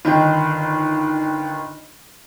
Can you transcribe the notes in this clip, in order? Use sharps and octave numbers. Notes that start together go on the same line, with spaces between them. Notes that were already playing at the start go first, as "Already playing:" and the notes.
G1 D#3 D#4 G5